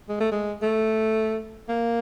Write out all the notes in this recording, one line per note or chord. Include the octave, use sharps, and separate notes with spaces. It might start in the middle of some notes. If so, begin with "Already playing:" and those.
G#3
A3
G#3
A3
A#3